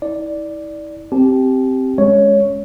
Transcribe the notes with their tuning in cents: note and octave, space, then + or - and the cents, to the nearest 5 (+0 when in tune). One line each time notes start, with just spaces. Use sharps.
E4 -40 D5 +0
C4 +0 G4 -10 A5 -35
G#3 +0 C#4 +0 C#5 +10